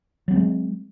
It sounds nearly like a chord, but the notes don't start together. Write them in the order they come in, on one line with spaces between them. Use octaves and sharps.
F#3 B3 C4 G#3